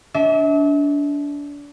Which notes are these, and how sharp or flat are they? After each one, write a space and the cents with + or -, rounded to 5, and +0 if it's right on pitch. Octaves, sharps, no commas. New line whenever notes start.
D4 -30 E5 -40